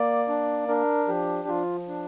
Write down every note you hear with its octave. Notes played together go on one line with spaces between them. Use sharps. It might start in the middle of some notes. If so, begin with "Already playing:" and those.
Already playing: A#3 D5
D4
D4 A#4
F3 G4
F3 F4
D4